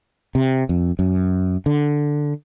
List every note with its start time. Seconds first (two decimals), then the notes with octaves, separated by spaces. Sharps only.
0.35 C3
0.69 F2
0.99 F#2
1.66 D3